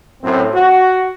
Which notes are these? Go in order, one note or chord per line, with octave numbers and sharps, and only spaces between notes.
F#2 A2 C4
F#4